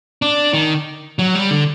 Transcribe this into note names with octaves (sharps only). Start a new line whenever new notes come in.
D4
D#3
F#3
G3
D3